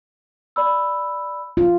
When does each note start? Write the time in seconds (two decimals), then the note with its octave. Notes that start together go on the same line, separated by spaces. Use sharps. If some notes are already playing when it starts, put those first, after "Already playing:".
0.56 D5 B5 E6
1.57 F4